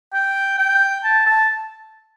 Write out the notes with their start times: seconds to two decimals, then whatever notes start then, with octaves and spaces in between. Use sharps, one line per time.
0.14 G5
0.58 G5
1.04 A5
1.26 A5